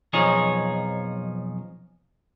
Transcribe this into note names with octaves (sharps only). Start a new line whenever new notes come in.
B1 F2 F3 D#4 G#4 C#5